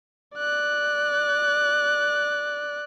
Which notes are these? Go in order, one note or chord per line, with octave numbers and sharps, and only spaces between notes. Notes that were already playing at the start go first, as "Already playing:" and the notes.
D5 F#6